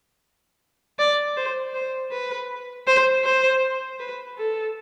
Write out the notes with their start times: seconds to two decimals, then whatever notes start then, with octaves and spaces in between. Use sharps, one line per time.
0.99 D5
1.37 C5
1.74 C5
2.12 B4
2.87 C5
3.25 C5
4.00 B4
4.38 A4